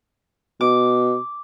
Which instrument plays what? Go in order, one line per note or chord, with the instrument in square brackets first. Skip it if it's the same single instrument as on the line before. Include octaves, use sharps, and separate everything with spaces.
[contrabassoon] B2 [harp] D6